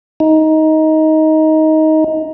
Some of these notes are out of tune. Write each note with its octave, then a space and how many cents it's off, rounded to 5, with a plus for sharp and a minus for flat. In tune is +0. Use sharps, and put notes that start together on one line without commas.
D#4 +15